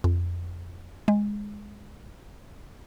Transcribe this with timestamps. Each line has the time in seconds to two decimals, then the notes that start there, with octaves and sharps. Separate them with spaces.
0.04 F2
1.08 G#3